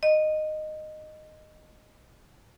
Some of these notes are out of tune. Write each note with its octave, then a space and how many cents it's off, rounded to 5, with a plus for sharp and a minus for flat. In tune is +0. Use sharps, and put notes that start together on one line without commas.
D#5 -15